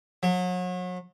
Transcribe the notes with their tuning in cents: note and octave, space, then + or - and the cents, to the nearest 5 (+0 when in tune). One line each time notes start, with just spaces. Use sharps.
F#3 -35